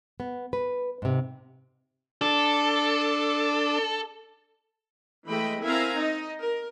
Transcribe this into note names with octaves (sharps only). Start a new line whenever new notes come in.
B3
B4
G#2 C3
D4 A4
E3 G#3 A3 D#5 G5 B5
C4 E4 A#4 F5 G#5 A#5
D#4 D#5
A#4